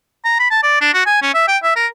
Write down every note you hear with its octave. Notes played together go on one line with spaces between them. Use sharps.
A#5
B5
A5
D5
D4
F#4
G#5
C#4
E5
G5
E5
A#4